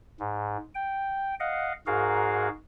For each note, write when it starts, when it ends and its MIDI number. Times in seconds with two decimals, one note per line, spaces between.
0.20 0.57 44
0.75 1.35 79
1.40 1.73 75
1.40 1.73 77
1.40 1.73 78
1.87 2.49 44
1.87 2.49 66
1.87 2.49 68
1.87 2.49 70
1.87 2.49 77